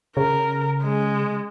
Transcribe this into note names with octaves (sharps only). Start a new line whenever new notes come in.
C#3 A#4
G#3